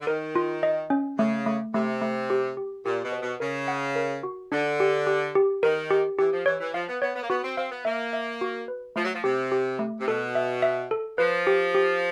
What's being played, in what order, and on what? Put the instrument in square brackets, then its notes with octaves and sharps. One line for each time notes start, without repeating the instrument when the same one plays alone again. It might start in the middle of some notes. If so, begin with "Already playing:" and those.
[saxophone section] D3
[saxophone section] D#3 [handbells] A#4
[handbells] F4
D#5
C#4
[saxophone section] C#3 [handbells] A3
[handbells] A3
[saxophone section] C3 [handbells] A3
[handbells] A3
G4
G4
[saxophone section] A#2 [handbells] G4
[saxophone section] B2
[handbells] C5
[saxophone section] B2
[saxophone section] C#3 [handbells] A#4
[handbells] F#5
A#4
F#4
[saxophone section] D3 [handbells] D4
[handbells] G4
G4
G4
[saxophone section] D#3 [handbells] A#4
[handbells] G4
[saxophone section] E3 [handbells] G4
[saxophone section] F3
[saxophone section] E3 [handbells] C#5
[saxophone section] E3
[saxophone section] F3 [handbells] F5
[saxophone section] B3
[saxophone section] B3 [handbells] C#5
[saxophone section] B3
A#3
[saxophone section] B3 [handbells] F#4
[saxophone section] C4
[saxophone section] C4 [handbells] F5
[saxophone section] B3
[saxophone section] A#3 [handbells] E5
[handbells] E5
F#4
B4
[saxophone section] F3 [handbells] A3
[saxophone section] F#3
F3
[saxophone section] C3 [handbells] G4
[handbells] G4
A3
[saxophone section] C3
[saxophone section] B2 [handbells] A4
[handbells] E5
E5
A4
[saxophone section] F3 [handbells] B4
[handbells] G4
G4